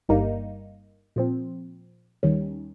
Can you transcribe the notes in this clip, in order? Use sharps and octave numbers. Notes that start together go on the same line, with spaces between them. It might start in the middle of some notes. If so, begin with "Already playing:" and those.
G1 G2 G3 A#3 D#4
A#2 F3 C4
D#2 D#3 G3 C#4